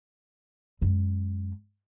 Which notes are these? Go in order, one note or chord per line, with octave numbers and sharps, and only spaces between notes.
F#2 G#3